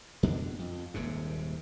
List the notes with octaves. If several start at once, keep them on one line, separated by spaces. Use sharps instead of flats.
F2 B2 D4
F2
D#1 D#2 G#2 C3